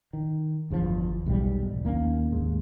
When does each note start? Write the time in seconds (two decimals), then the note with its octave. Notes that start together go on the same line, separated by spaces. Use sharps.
0.13 D#3
0.70 G1 E2 A#2 F3
1.26 B1 E2 G#2 G3
1.85 D#2 A#3 C4 C#4
2.32 D#2 G#2